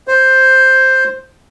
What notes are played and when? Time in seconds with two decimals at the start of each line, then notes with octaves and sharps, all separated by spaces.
0.08 C5